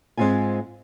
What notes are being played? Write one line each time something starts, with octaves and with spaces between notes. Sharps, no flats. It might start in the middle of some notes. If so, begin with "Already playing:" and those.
G#2 G#3 C4 E4 F4 G#5